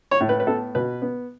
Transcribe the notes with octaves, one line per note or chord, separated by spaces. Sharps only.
C#5
A2
B4
B4
B3 A4
B2 B4
B3